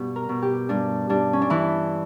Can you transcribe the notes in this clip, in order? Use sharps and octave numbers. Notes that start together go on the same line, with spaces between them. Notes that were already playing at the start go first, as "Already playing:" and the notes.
Already playing: G2 B2 G4
A#4
B2
G4
G2 D4
G2 D4
C#4
D4
E3 E4